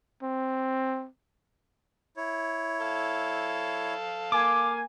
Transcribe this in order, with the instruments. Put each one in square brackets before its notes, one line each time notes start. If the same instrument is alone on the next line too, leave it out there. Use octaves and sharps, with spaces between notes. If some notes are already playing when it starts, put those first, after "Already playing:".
[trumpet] C4
[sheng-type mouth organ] E4 C#5
[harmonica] A4 F5
[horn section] A#3 G#5 [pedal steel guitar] D6